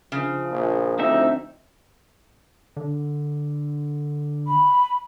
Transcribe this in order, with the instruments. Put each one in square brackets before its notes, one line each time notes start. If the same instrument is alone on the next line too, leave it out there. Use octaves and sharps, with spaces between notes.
[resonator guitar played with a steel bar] C#3 [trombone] F3
[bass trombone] A#1
[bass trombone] D2 [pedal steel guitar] C4 D#4 E5
[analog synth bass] D3
[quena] B5